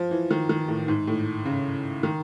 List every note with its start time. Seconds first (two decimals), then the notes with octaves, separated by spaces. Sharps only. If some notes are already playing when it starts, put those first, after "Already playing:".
Already playing: F3
0.11 E3
0.31 D#3
0.49 D#3
0.68 A2
0.88 G#2
1.07 A2
1.45 C#3
2.03 D#3